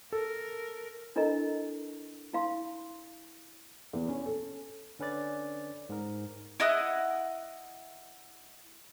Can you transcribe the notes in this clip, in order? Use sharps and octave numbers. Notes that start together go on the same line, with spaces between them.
A4 A#4
D4 E4 A4 A#4 D#5 A#5
E4 F5 C6
E2
C#4
A4
D3 C#4 B4 D5 A6
G#2 A#4
E4 D#5 F#5 D#6